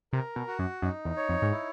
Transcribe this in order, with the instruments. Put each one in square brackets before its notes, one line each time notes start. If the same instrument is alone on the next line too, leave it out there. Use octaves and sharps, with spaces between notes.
[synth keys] C3 [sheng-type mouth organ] A#4
[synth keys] B2
[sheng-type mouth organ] F#4
[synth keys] F#2
[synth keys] F#2 [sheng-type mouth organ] D#4
[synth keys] E2
[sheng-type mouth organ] C#5
[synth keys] F2
G#2
[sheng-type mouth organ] E4